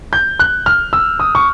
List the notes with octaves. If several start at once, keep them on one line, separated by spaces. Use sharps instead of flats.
G6
F#6
F6
E6
D#6
C#6